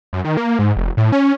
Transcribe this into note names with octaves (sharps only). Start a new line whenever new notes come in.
F#2
D#3
A#3
G#2
F1
A2
C#4